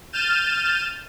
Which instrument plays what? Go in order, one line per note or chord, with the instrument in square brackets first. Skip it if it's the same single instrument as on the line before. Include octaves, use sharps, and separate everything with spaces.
[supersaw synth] F6 G6 A6 D#7 E7